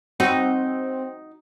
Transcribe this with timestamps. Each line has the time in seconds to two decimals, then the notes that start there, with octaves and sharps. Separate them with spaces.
0.20 C4 D#4 F#4 B4